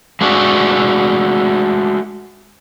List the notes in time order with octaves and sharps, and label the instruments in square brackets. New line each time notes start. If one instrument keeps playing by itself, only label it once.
[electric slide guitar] G#3 A3 D4 F#4